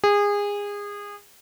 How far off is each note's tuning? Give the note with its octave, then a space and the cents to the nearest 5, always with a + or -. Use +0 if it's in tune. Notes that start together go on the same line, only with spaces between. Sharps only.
G#4 -25